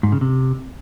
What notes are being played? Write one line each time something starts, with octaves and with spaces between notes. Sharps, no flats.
G#2
C#3
C3